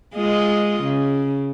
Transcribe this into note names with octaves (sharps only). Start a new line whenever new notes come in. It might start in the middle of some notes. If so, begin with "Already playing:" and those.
G#3 F4 D#5
C#3